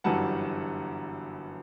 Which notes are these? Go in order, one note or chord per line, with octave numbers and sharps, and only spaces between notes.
G1 F#2 E3 G3 F#5 A5